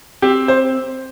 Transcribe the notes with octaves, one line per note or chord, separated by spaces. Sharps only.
C4 G4
C5